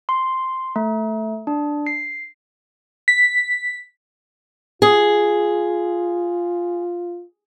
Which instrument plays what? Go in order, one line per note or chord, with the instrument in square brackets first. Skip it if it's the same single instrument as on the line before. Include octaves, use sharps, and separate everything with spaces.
[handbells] C6
A3
D4
C7
[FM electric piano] B6
[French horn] F4 [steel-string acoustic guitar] G#4